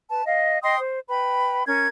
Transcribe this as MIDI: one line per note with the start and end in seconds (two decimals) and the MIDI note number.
0.10 0.22 71
0.10 0.22 81
0.26 0.58 75
0.26 0.58 77
0.62 0.78 75
0.62 0.78 79
0.62 0.78 84
0.62 0.78 87
0.80 1.00 72
1.09 1.63 71
1.09 1.63 79
1.09 1.63 83
1.67 1.87 61
1.67 1.87 70
1.67 1.87 92